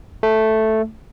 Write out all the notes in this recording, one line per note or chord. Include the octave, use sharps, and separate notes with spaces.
A3